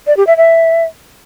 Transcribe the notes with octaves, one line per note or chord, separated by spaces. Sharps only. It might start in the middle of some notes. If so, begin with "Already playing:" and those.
D5
G4
E5
E5